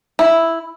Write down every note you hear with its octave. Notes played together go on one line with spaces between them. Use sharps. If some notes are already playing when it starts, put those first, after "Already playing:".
E4